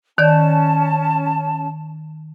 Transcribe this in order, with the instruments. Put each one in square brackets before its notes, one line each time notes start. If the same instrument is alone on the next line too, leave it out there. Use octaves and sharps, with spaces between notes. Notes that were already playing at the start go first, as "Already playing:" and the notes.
[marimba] D#3 D5 G6 [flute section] C#4 A5